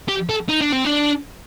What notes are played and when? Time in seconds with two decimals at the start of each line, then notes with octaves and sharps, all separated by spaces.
0.09 G4
0.30 A4
0.49 D#4
0.61 D4
0.72 C4
0.85 D4